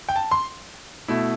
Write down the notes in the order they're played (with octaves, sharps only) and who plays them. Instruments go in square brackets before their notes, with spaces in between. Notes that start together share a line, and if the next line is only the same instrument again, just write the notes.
[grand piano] G5
A5
C6
B2 A3 E4